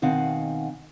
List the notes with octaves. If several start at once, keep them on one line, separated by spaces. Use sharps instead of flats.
B2 D#3 C4 F5 F#5 G#5